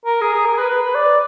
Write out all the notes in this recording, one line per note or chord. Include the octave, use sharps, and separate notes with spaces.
A#4
G#4
G#4
A#4
B4
B4
D5